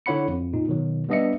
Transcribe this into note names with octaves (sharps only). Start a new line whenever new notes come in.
D3 E4 C#5 F#5 B5 C#7
F2
A#2 D#4
B2 D#3 F#3
G3 B3 D4 D#5 E5 C#7